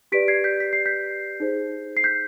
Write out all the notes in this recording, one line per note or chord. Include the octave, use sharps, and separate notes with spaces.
G4 B4 D5 B6 D7
G#6 C7
G6 B6
B6
C7
G6 B6
D#4 G#4 C5
C7
G6 B6